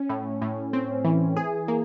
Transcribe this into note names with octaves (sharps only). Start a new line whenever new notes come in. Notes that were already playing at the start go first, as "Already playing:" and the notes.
Already playing: C#4
A2
A2
C4
E3
G#4
A#3